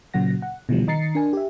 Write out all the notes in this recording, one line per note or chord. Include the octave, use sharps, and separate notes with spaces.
A#2 C#3 F#3 F#5 A#6
F#5
B2 D3 E3 F3 G3
D#3 D#5 A#5 A6 C7 C#7
D4 A#4 G#5
G4 E5